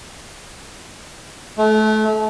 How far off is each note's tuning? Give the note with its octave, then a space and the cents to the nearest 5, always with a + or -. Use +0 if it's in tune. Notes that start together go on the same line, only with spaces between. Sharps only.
A3 -30